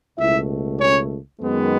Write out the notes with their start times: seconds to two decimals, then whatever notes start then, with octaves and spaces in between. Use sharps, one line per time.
0.18 C#2 B2 A3 E4 E5
0.79 C#4 C#5
1.41 F#2 D#3 G#3 B3